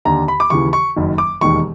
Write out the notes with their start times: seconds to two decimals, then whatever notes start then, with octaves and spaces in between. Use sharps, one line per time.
0.05 D#2 D3 A#5
0.28 B5
0.40 D6
0.50 D#2 C#3 E3 C#6
0.73 C#6
0.96 F#1 F#2 D#3
1.18 D6
1.41 E1 D#2 D#3 C#6